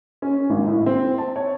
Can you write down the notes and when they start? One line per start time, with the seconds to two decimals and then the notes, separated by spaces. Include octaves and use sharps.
0.22 C#4
0.50 G#1
0.67 A2
0.86 C4
1.18 A5
1.36 C#5